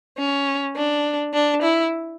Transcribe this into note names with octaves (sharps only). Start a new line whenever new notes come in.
C#4
D4
D4
E4